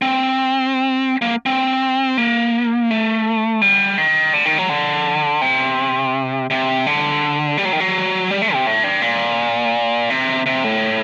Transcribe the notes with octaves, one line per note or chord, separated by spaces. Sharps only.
C4
A#3
C4
A#3
A3
G3
D#3
D3
D#3
F#3
D3
C3
C3
D3
G3
F#3
D#3
F#3
G3
A3
C3
A2
G2
A#2
C3
C3
A2